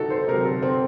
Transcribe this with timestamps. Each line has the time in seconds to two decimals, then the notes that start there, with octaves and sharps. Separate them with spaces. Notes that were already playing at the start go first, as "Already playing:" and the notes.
Already playing: C3 F#3 D#4 F#4 A4
0.10 C5
0.28 C3 A#4
0.33 F#3
0.45 A4
0.62 C4